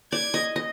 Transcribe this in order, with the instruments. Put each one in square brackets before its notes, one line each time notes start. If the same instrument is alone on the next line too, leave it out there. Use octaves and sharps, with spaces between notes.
[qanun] D5 [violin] G#6
[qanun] D#5
D#5